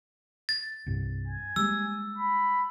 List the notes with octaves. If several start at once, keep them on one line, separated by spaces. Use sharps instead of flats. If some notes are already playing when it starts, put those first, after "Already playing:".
A6
C2 G2
G#5
G3 G#3 A#3 E6
B5